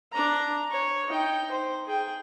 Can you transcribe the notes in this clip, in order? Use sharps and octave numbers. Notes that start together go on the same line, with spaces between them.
D4 A#5
C#5
D#4 G5
C5
G#4 G5